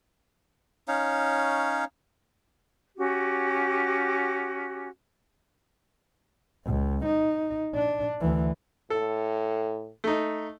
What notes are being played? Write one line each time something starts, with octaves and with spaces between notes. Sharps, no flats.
C#4 D#4 C#5 F5
C#4 F#4 G4
C#2
D#4
D4
D2 E3
A2 A4
A3 D#4